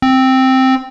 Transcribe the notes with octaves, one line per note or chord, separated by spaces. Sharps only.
C4